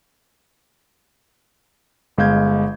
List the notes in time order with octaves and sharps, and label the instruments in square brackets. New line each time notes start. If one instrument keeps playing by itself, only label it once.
[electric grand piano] G1 G#3 F5 G6 G#6